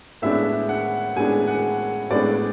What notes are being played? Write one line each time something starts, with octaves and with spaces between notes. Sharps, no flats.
A2 G#3 B3 D4 E5
F#5
A2 G#3 B3 D4 G#5
F#5
A2 G#3 B3 D4 D5